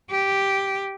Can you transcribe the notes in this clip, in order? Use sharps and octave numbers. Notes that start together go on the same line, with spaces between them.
G4